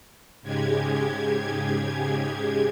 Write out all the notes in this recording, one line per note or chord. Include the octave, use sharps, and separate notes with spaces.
G#2 C#3 G#3 G4 G#6